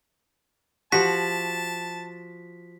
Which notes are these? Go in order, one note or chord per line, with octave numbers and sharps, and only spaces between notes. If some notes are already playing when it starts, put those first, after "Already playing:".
F3 F#4 G4 A5 B6